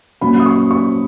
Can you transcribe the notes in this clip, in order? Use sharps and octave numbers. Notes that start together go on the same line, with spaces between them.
A#2 F#3 C#4 B5
D#6
C#6
C#6